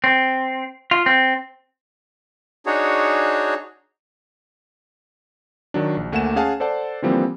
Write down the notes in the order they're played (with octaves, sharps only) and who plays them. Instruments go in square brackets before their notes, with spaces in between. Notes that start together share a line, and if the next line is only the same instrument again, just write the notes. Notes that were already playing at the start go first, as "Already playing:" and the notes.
[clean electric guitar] C4
F4
C4
[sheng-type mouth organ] D4 D#4 F#4 G#4 C#5
[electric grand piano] D#3 F#3 D4
A#1
D2 A3 A#3 F#5 G#5 E7
C#4 G#4 F5 F#5 G#5 A5
A4 C5 D5 F#5 A5
D3 E3 F3 G3 A#3 C4